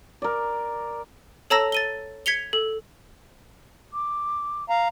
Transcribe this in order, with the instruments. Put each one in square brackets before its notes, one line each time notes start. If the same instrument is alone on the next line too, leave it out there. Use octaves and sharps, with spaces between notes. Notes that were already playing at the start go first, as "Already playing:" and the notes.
[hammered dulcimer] A#4 D5
[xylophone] A4 C#5 A5 A#5 E6 A#6
A6 D#7 G7
G#6 B6 C#7 F7 G7
A4
[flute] D6
[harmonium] F5 A#5